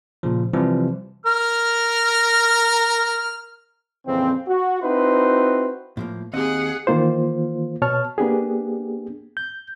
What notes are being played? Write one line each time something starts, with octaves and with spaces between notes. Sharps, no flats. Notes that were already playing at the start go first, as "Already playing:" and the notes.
A#2 C#3 F3
C3 E3 F3 G3
A#4 F6
F2 A#2 C#3 E3 C4
F#4
C4 D#4 E4 F#4 B4 C5
A2 F3 A#3
D#2 C4 G#4 D#5 F#5
D#3 E3 A#3 F4 C5
B2 C#5 A5 F6
A#3 B3 D4 G4 G#4
G6